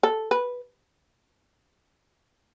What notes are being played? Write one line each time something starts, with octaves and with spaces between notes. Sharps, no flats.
A4
B4